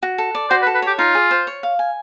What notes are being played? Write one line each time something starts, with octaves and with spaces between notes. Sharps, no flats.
F#4
A4
D5
F#4 C5
B4
A4
B4
G4 C#5
D#4 F4
G#4
C5
C#5
F5
G#5